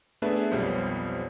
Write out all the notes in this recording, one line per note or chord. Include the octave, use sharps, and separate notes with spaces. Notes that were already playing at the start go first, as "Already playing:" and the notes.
A3 B3 D4 G#4 B4 E5
B1 F2 G3 B3 C5 C#5